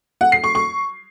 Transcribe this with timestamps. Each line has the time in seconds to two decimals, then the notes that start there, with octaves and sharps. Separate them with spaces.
0.21 F#5
0.32 C7
0.44 C#6
0.55 C#6